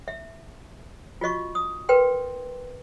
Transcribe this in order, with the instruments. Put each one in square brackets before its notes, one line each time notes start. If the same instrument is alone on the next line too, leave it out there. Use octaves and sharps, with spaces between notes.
[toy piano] E5
F4 F#4 D#5 C#6
D#6
A#4 B4 G5 C6